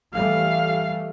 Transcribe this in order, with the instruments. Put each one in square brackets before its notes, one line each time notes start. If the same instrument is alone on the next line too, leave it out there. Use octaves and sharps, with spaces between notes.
[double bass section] E3 G3 A3 [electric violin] F5